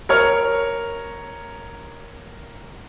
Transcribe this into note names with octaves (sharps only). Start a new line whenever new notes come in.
A#4 C#5 F6